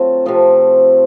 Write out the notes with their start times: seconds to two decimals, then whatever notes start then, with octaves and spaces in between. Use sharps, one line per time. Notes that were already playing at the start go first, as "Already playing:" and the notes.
Already playing: F#3 A3 C4 F4
0.25 C3 F3 A3